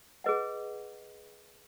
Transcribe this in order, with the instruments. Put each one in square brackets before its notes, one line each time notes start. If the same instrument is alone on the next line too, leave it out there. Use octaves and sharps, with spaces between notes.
[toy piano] G#4 B4 D#5 F#5